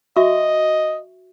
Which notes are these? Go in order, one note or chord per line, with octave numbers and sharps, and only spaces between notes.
F#4 D#5 E5 C#6